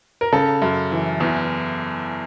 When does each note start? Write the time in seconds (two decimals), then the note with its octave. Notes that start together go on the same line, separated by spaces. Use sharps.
0.21 A#4
0.32 C#3 A4
0.62 F#2
0.92 E3
1.20 E2